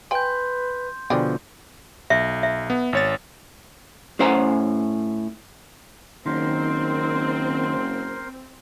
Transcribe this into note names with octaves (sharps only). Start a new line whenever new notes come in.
B4 G5 G#5 C6 G6
B2 D3 F3 D4 G#4 G5
B1 E5
E5
B3
G#1 C#5 A6
A2 C#4 C5 F#5 G#5 A#5
F#1 D#3 C4 A#4 C5 C6